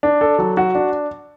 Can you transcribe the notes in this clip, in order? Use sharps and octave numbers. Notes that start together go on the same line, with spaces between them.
D4
A4
F#3
F#4
D4